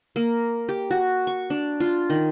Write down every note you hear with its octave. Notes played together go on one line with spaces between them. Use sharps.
A#3
G4
F#4
C#6
D4
F4
D#3